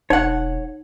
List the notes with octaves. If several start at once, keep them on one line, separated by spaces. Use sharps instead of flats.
E1 D#4 C#5 F#5